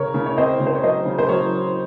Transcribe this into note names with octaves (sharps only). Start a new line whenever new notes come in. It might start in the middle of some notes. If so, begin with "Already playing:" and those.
Already playing: C#3 A#4 C#5
C#3
C#5
C4 C5 D#5
C#3
C5
C#5
F#3 C5 D#5
C#3
C5
F#3 A#4 C#5